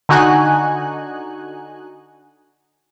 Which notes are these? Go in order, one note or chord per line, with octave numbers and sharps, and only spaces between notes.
D3 D#4 F#4 G#5 F#6